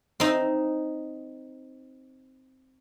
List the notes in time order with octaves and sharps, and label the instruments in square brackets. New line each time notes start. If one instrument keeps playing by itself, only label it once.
[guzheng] C4 D#4